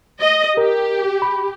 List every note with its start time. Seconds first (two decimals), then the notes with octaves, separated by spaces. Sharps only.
0.21 D#5
0.57 G4 A#4
1.22 B5